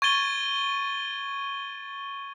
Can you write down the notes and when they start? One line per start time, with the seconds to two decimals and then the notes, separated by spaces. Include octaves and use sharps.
0.02 C#6 G#6 A6 D#7 G7